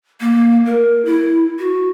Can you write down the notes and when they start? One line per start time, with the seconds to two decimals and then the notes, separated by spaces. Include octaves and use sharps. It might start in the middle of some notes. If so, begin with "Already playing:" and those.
0.21 A#3
0.66 A#4
1.05 E4
1.59 F#4